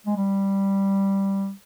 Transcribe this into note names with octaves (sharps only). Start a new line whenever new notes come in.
G#3
G3